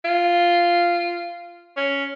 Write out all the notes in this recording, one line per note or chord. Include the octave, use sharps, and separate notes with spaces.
F4
C#4